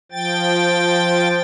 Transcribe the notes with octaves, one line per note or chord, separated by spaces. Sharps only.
F3 G5 A6